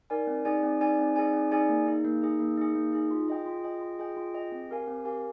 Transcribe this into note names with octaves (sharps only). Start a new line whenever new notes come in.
D#4 A#4 D5 G#5
C4
D#4 G#4 D5 G#5
C4
D#4 G#4 D5 G#5
C4
D#4 G#4 D5 G#5
C4
D#4 G#4 D5 G#5
A#3
D#4 G#4
A#3
D#4 G#4
A#3
D#4 G#4
A#3
D#4 G#4
F4
G#4 D#5 G5
F4
G#4 D#5 G5
F4
G#4 D#5 G5
F4
G#4 D#5 G5
C4
G4 A#4 F5 G#5
C4
G4 A#4 F5 G#5